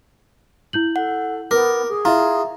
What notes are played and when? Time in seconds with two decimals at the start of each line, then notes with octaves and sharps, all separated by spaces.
0.73 E4 G6 F#7
0.96 A4 F#5
1.51 B3 A#4 D6
1.88 G#4
2.05 E4 F4 E5 A#5